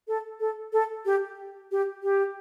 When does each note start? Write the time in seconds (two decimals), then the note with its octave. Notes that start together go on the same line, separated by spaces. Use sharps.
0.08 A4
0.40 A4
0.73 A4
1.05 G4
1.71 G4
2.03 G4